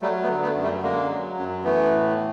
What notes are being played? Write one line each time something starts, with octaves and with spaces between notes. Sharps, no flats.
F#3 G3 A3
A3 B3
D3
A3 B3
F#2
G3 A3
D3 G#3 A#3
F#3
F#2
E3 A3 B3
A2